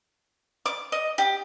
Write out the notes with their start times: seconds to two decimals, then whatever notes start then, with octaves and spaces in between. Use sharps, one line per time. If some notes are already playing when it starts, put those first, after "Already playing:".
0.66 D6
0.92 D#5
1.18 G4